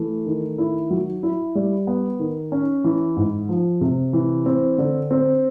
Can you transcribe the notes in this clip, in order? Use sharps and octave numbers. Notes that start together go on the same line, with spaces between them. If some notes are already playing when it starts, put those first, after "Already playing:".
Already playing: E3 A3
D#3
E4
F#3
E4
G3
B3
D#3
C#4
E3
G#2
F3
C3
E3
C4
D3
C4